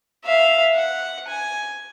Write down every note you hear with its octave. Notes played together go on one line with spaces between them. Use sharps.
E5 F5
F#5
G#5